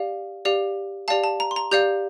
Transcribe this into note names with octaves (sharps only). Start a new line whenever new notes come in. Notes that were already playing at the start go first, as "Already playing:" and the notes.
Already playing: G4 D5 F5
G4 D5 F5
G4 D5 F5 A5
A5
A#5
C6
A#5
G4 D5 F5 G6